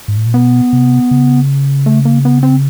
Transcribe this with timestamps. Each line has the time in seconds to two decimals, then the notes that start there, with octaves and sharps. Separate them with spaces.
0.08 G#2
0.17 A2
0.26 A#2
0.34 B2 B3
0.73 C3
1.11 C#3
1.86 A3
2.05 A#3
2.25 B3
2.43 C4